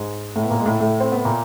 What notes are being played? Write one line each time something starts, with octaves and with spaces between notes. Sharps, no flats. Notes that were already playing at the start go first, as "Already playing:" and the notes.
Already playing: G#2 G#3
A2 A3
B3
A#2 A#3
G#3
A2 A3
A2 A3
C4
B3
A#2 A#3